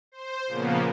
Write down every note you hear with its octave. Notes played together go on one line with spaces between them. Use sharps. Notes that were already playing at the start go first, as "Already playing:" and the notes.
C5
A#2 C#3 F3 A#3 B3